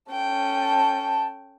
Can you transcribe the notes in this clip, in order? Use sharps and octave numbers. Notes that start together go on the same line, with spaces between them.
C#4 A4 G5
A5